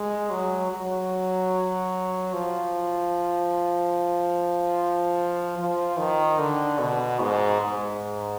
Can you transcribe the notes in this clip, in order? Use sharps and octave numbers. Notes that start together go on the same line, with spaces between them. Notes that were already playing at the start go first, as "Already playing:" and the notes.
Already playing: G#3
F#3
F#3
F3
F3
D#3
D3
B2
G#2
G#2